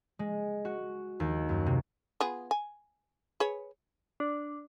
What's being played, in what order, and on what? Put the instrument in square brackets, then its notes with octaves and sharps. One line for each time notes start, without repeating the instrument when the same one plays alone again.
[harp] G#3
F#4
D#2
F#2
C3
[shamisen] B3 F4 G#4
G#5
G#4 B4 C#5
[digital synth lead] D4